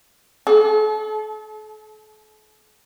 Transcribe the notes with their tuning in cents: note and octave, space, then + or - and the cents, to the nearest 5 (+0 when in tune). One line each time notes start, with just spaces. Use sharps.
A4 -40